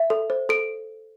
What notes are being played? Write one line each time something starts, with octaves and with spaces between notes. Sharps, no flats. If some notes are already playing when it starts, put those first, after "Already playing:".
Already playing: E5
A4
C5
A4 D7